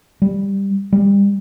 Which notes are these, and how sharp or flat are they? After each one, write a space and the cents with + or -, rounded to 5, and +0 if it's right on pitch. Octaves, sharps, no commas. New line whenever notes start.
G3 +10
G3 +30